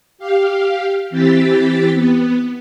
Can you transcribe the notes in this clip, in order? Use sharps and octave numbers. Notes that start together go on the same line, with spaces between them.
G4 F5
E3 C4 G4 A6 B6
B3